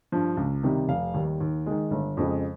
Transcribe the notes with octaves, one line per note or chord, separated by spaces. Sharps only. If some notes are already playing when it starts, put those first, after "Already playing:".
G2 F3
C#2
C3 D#3 G3
F1 F5
D#2 D#3 G3
D#2
D#3 G#3
G1
F2 C#3 G#3